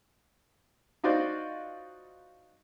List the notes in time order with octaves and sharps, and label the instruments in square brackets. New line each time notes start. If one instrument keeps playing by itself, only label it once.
[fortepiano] D#4 F4 F#4 C5 D5 D#5